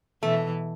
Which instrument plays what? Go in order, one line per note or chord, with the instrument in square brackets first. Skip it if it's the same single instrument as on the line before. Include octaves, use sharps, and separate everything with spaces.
[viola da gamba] B2 E3 [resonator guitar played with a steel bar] A3